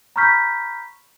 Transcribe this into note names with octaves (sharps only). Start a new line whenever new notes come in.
A#5 B5 C#6 F6 G6 B6